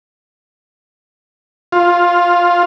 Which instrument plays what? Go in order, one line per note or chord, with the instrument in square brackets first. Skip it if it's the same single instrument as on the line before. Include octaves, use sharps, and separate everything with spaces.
[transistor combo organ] F4